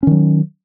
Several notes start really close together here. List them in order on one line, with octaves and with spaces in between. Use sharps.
C#4 D#3 F#3